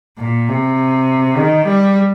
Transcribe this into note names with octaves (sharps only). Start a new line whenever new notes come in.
A#2
C3
D#3
G3